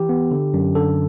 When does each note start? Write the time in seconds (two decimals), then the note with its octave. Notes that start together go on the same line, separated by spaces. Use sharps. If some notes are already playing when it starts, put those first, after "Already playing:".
Already playing: E3 G4
0.09 B3
0.31 D3
0.54 F#2
0.75 D3 A4